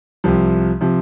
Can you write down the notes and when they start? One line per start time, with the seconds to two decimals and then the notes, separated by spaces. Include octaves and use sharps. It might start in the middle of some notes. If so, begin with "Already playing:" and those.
0.24 C2 C3 F3
0.81 C3 F3